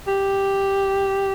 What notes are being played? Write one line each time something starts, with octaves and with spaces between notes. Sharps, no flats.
G4